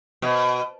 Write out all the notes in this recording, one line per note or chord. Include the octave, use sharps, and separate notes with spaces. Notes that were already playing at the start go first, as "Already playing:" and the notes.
B2